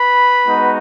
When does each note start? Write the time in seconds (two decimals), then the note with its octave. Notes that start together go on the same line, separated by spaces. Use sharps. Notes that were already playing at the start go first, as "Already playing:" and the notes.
Already playing: B4 B5
0.46 G#3 B3 D#4 F#4